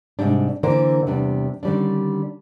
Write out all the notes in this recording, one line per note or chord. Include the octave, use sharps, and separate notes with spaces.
G#2 C3 G3 D4
D3 E3 A#3 D4 A#4 C5
E2 C3 G3 B3 D4
D3 D#3 G3 C#4 D4